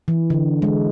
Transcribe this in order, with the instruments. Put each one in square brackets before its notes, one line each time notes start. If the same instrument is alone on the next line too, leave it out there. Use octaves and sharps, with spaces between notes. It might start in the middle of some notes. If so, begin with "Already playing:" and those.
[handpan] E3
D3
G#3